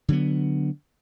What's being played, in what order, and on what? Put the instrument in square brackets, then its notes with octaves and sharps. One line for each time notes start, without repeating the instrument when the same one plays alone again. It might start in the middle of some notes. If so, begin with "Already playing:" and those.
[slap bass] D3 F#3 B3